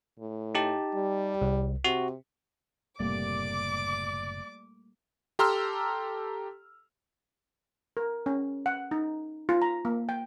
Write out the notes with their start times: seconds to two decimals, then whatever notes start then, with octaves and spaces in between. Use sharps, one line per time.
0.19 A2
0.55 D#4 G4 A5
0.94 G3
1.41 C2
1.84 C3 F#4
3.00 F#1 A2 C3 G3 A3 A#3 D5 D6
5.39 G4 A4 A#5 C6 E6 F6
7.97 A#4
8.26 C#4
8.66 F#5
8.91 D#4
9.49 F4
9.62 A#5
9.85 A#3
10.09 G5